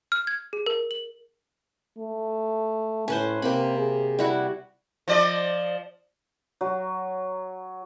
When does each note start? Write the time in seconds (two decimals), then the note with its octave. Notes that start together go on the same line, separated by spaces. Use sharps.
0.12 F6
0.27 G#6
0.53 G#4
0.66 A#4
0.91 F#7
1.98 A3
3.08 A2 C#4 B4 C5
3.42 C3 A#3 C4 B5
3.78 G#4
4.19 G3 E4 F#4
5.08 F3 D5 D#5
6.61 F#3